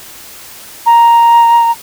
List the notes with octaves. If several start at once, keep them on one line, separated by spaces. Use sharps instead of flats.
A#5